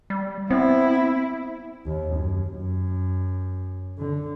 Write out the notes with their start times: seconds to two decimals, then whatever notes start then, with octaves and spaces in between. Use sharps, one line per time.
0.10 G3
0.50 B3 C4 E4
1.86 D#2
2.16 F#2
2.50 F#2
3.99 D3